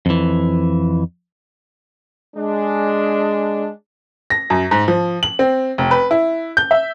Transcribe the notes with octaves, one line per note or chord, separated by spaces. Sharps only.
F2 E3
G#3 D4
A#6
F#2
G#2
F3
F#7
C4
F1
B4
E4
G6
E5